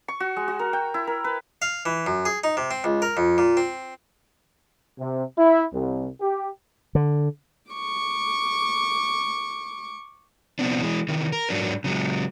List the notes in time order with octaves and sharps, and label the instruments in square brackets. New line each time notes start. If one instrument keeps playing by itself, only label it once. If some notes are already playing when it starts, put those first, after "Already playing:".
[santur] C#6
F#4
G#3
F#4
A#4
G5
E4
A#4
B4
[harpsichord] F5
E3
F#2
G#4
D#4
C3
C4
C#2
A#4
F2
A#2
C4
[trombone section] C3
E4
C2
G4
[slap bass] D3
[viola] C#6 D6
[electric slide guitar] C3 F3 B3 C4 D4
E3 G#3
C3 D#3 E3
A#4
G#2 F#3 D4 A#4
C#3 F#3 G#3